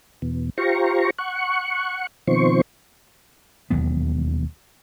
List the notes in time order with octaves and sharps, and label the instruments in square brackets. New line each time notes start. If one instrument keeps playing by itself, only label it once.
[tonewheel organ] E2 B2
F4 G4 C5 A#5 C#6
F#5 C#6
B2 D#3 F3 C4 C5 C#6
[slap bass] E1 D#2 F#3 B3